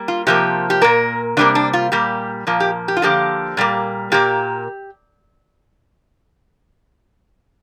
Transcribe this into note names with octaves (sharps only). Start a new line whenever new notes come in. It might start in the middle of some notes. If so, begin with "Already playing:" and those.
Already playing: G3 A#3
F4
C3 F3 A#3 G4
G4
A#2 A#3 A#4
C3 G3 A#3 D4
D4
F4
A#2 G3 A#3 G4
A#2 F3 A#3
G4
G4
F4
D3 F3 A#3 G4
A#2 G3 A#3
A#2 A#3 G4